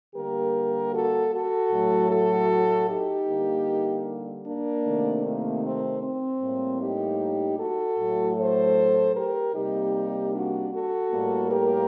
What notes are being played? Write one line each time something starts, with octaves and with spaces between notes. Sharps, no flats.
D3 G3 A#3 G4 A#4
F#4 A4
F#4 A4
A2 F#3 A3
F#4 A4
D#4 G4
D3 G3 A#3
A#3 D4
C3 D#3 A3
A#3
C4
C4
A2 G3 A#3
D#4 G4
F#4 A4
A2 F#3 A3
A4 C5
G4 A#4
C3 G3 A#3 D#4 G4
D4 F#4
F#4 A4
A2 G3 A#3
G4 A#4